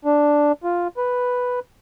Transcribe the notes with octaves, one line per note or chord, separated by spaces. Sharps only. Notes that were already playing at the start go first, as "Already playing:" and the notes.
D4
F4
B4